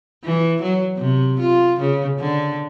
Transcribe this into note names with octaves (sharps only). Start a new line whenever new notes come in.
E3
F#3
C3
F4
C#3
D3